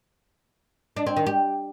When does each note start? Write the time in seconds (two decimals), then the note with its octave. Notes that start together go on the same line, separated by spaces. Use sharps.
0.96 D4
1.06 C4
1.16 D#3
1.27 G4